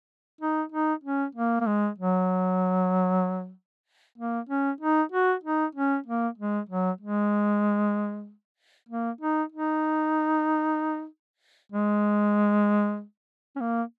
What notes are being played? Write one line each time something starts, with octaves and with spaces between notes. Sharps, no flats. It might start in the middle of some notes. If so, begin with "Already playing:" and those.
D#4
D#4
C#4
A#3
A#3
G#3
F#3
A#3
C#4
D#4
F#4
D#4
C#4
A#3
G#3
F#3
G#3
A#3
D#4
D#4
G#3
C#4
A#3